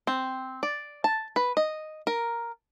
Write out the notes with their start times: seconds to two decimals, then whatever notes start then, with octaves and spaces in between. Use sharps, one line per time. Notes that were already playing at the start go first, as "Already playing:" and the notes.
0.07 C4
0.63 D5
1.04 A5
1.36 B4
1.57 D#5
2.07 A#4